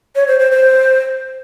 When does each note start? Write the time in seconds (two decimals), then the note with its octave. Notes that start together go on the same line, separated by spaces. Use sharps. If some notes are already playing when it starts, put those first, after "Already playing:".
0.16 C#5
0.28 C5
0.39 C5
0.51 C5